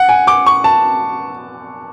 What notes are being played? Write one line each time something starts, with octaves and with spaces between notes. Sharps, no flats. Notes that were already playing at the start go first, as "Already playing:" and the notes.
Already playing: F#5
G#5
D6
C#6
A5